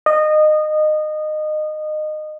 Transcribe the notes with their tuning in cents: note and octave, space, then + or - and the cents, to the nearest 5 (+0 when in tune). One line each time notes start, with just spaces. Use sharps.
D#5 -20